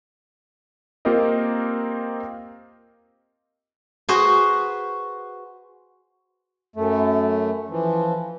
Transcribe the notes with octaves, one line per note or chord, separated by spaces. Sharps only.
A#3 C4 F4 G4 A#4 D#5
F#4 G#4 B4 C5
F#2 A3
E3 F3